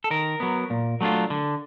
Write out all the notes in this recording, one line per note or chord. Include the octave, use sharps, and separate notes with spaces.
A4
D#3 A#4
F#3 B3
A#2
F#3 A3 D4 F4
D3